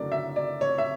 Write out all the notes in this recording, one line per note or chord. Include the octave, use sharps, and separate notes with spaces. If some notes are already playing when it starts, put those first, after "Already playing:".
Already playing: F#1 F#2 D3 F#3 A3 D5
E5
D5
C#5
E5